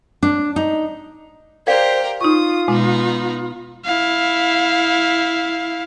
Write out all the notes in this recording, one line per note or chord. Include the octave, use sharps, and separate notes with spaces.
D4
D#4
G4 A#4 C5 D5 F5
D#4 F4 C#6 D#6
B2 G#3 B3 D#4 D6
E4 F5